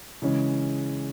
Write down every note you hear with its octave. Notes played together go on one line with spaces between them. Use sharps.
C#3 E3 G#3 C#4